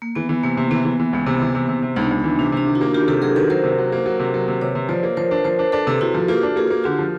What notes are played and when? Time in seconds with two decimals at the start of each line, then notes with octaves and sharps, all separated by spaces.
0.02 A#3
0.15 E3 B3
0.29 E3
0.43 C3 A#3
0.57 C3
0.71 E3 B3
0.85 E3
1.00 E3
1.13 C#2 A#3
1.26 C3 B3
1.41 E3
1.55 C3 A#3
1.69 C3
1.82 C3 B3
1.96 C#2 D#4
2.02 D4
2.11 C#2
2.20 E3 D#4
2.39 C3 D4
2.52 C3 D4
2.67 D#3
2.75 E4 F#4
2.81 A#3
2.94 D#3 F4 G4
3.08 C3 G4 A4
3.22 F#3 G#4 A#4
3.36 D#3 A4 B4
3.50 F#3 A#4 C5
3.64 C3
3.78 F#3
3.92 A#3
4.06 F#3
4.20 C3
4.34 F#3
4.48 C3
4.61 C3 B4 C#5
4.75 C3
4.89 F3 C5 D5
5.03 A#3
5.17 F3 A#4 C5
5.31 D4
5.45 F3 A#4 C5
5.59 D4
5.72 D4 A4 B4
5.87 C3
6.01 C3 E4 F#4
6.15 F3
6.28 A#3 F4 G4
6.43 D4
6.56 A#3 F#4 G#4
6.70 A#3
6.84 D3 F4 G4
6.99 F3